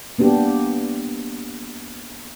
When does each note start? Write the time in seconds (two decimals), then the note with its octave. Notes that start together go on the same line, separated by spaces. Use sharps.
0.18 A#3 B3 D4 G4